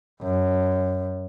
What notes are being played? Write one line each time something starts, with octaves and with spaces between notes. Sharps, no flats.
F#2